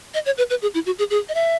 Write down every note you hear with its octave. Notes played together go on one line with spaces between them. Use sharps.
D#5
C#5
B4
B4
G#4
E4
F#4
G#4
G#4
D#5
E5